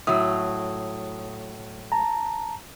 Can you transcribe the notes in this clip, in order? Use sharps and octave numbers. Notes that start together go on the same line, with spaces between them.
A2 F#3 D#6
A5 A#5